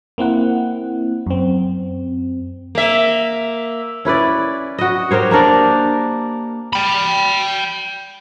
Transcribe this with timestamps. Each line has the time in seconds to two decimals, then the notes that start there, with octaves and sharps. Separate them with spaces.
0.18 A#3 C4 E4 F#5
1.27 F#2 C4
2.75 A#3 E5
4.05 C#4 E4 B4 D5
4.78 F#4 D#5
5.11 G4 A#4 C5 C#5
5.31 A#3 D4 A#4 D5
6.73 G5 B5